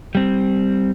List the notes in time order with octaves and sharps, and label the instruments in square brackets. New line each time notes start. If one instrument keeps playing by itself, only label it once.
[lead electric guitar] G3 C4